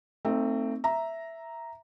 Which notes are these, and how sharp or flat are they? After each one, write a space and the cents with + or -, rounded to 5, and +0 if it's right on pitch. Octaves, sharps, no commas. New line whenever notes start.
A3 +30 C4 +0 D#4 +0
E5 +0 A#5 +0